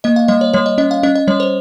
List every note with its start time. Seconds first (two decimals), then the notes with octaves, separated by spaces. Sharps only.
0.04 A#3 D#5
0.16 F5
0.28 G3 D#5
0.41 C#5
0.53 G3 C#5
0.66 D#5
0.78 C#4 D#5
0.91 F5
1.03 C#4 D#5
1.15 D#5
1.28 G3 C#5
1.40 C5